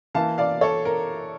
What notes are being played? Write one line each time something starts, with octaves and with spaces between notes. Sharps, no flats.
E3 A#3 E4 F5 A5
D5 F5
A4 C#5
A#4